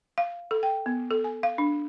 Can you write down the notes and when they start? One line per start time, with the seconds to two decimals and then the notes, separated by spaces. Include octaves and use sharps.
0.18 F5
0.51 A4
0.63 G5
0.86 B3
1.11 A4
1.24 G#5
1.43 F5
1.58 D4